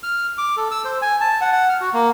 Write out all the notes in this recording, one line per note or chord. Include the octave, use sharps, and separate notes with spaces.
F6
D6
A4
E6
C5
G#5
A5
F#5
F#5
F6
F#4
A#3